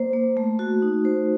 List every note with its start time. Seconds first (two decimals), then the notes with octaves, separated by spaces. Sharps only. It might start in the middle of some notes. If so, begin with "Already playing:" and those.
Already playing: A#3 C5
0.13 A#3
0.37 A3
0.59 F#4
0.82 D#4
1.05 C5